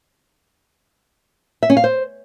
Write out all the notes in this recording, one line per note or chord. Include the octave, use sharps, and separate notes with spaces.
E5
C#4
F5
C5